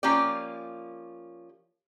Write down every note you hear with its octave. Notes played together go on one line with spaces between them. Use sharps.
F3 A#3 C#4 F4 G4 D5